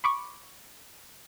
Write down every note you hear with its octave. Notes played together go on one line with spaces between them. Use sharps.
B5 C#6 D6